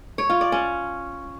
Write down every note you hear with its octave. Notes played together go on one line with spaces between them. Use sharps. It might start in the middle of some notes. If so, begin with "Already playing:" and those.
C#5
F4
D5
C#4